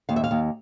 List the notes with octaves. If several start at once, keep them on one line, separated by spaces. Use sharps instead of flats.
D#2 F5
E5
F5
D#2